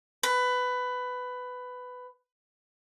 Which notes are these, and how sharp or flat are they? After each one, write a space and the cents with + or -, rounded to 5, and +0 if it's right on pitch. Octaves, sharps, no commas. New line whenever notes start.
B4 +15